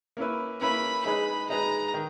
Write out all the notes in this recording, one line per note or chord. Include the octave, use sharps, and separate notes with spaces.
A#3 C#4 E4 B4
A#3 C#4 E4 B4 B5
G#3 D#4 G#4 B4 B5
G#3 D#4 G#4 B4 A#5
D#3